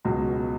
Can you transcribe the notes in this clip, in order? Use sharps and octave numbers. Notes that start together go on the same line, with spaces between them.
C#2 B2 F#3